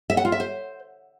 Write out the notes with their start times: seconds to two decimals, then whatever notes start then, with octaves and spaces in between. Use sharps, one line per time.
0.10 E5
0.17 F#5
0.25 F4
0.32 E5
0.40 C5